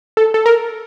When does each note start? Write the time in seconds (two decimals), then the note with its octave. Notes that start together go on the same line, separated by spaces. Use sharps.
0.17 A4
0.34 A4
0.46 A#4